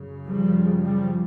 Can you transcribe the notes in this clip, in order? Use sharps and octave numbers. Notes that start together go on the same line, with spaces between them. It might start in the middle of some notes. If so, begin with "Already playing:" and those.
Already playing: F#2 C#3
F3 G3
F3 G3